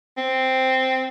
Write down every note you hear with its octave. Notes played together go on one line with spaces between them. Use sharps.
C4